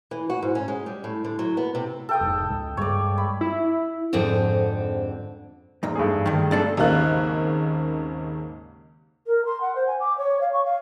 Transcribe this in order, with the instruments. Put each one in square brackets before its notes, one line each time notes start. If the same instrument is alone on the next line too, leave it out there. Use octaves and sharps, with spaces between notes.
[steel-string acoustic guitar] E3
F#4
G#2
C#4
G#3
G3
A2
D3
F#3
B3
C3
[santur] A4 G5 D#6
[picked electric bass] F1 G#2
C#2
[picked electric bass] G2 G3 G#3 [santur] C#5 D5
[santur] B5
[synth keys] E4
[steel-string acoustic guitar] F2 G#2 D3 C4
[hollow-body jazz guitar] E2 G#2
[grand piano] G2 A3 G#4
[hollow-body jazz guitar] D2 D#3
B1 D4 A4
[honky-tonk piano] G#1 D#2 C#3 A#3 F5 F#6
[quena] A#4
C6
F#5
C5
G#5
D6
C#5
F5
C#6
F5